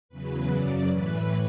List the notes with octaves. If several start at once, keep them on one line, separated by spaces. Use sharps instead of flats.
E2 C#3 F#3 B4
F#2 C#3 F#3 D5
A2 E3 B4